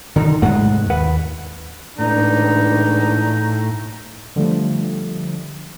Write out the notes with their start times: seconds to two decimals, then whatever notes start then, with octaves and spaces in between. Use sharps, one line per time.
0.16 D3 D#3 D#4
0.42 C2 G#2 G#3 A3 F#5
0.90 D#2 B4 F#5
1.98 C#2 A2 E3 D4 D#4
4.36 D3 F3 G3 A3